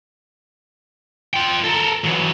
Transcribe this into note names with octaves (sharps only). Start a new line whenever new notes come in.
F4 G5
A4 A#4
E3 F#3